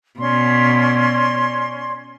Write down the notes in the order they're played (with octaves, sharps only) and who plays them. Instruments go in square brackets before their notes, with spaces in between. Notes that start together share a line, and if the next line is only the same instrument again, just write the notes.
[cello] B2 [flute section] C#4 D5 C6